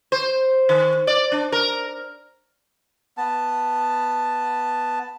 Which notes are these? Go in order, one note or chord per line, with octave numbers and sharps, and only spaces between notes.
C5
D#3
D5
D4
A#4
B3 A5